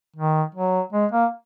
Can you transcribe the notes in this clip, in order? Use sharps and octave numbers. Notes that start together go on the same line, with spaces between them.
D#3
F#3
G#3
A#3